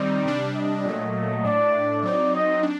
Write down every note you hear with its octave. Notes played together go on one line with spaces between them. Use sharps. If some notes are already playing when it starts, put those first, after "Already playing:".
Already playing: D#3 G3 C4 D#4 D5
C3 G3 D4
D#5
A#2 F#3 A3
A2 A3 D4 D5
F#3 C4 D#4 D5
D#5
D4